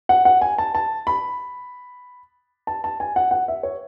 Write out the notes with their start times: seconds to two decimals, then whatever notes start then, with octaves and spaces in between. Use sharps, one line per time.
0.09 F#5
0.25 F#5
0.41 G#5
0.58 A5
0.75 A5
1.07 B5
2.67 A5
2.84 A5
3.00 G#5
3.16 F#5
3.31 F#5
3.48 E5
3.63 C#5